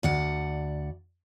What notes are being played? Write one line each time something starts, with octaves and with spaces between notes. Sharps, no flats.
D2 D5 F#5